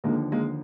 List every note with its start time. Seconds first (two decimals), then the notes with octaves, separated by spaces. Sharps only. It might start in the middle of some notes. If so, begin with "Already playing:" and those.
0.04 D#2 D3 F3 G#3 A#3
0.32 G#3 A#3